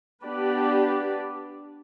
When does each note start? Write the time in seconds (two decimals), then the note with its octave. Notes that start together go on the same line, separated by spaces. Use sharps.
0.24 B3 D4 G4 B4 D5